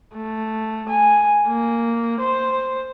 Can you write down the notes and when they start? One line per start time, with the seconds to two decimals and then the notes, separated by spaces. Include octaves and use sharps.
0.15 A3
0.89 G#5
1.48 A#3
2.20 C5